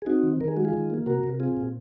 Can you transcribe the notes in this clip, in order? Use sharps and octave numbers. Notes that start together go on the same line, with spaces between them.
G#4
C4 D#4 F#4
D#3
D#3 A#4
G#4
G#3 F#4
F4 G#4
D#3
A#3
C3 F#4 A#4
C3
C4 F4 G#4
A#2